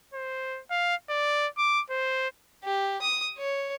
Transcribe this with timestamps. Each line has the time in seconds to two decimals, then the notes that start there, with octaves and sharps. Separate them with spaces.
0.13 C5
0.70 F5
1.09 D5
1.57 D6
1.90 C5
2.64 G4
3.01 D#6
3.38 C#5